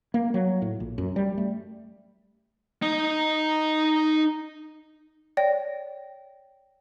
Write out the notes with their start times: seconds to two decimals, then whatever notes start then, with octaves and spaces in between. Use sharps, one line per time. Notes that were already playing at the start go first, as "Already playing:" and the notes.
0.14 A#3
0.34 F#3
0.62 A2
0.80 A#1
0.98 F#2
1.16 G3
1.38 A3
2.82 D#4 D#5
5.37 C#5 D5 G5 A#6